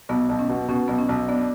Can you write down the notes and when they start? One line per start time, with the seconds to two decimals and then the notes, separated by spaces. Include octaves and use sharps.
0.09 B1 B3
0.29 B1
0.39 C#4
0.49 B2
0.69 B2 C#4
0.88 B1 B3
0.98 C#4
1.09 B1
1.28 B3 D4